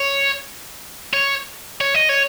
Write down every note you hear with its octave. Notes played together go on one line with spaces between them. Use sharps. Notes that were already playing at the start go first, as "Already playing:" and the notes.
Already playing: C#5
C#5
C#5
D#5
C#5